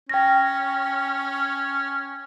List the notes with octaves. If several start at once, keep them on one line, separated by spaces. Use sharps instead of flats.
C#4 G5 A#6